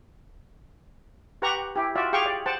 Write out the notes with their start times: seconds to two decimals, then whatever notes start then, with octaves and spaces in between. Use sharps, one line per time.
1.42 G4 B4 F#5 A#5 C#6
1.76 E4 G4
1.95 F4 F#4 D5 E5
2.13 G4 G#4 F5 G5 C#6
2.26 D5
2.46 C5 F#5 G5 A5